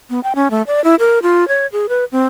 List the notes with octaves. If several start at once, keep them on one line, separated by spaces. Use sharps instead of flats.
B3
G5
C#4
A3
D5
E4
A#4
F4
C#5
G#4
B4
C4